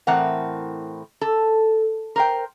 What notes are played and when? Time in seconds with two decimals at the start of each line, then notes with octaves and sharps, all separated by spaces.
0.07 A2 E3 C4 A#4 F#5
1.21 A4
2.16 A#4 C5 G5